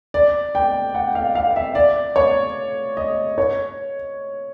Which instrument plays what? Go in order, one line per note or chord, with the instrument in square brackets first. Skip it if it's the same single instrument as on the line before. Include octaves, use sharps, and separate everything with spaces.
[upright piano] D5
G5
F#5
F5
F5
E5
D5
C#5
D#5
C#5